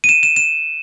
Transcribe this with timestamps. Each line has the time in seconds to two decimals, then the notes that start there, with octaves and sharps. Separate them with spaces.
0.04 D#7
0.09 E7
0.23 E7
0.36 E7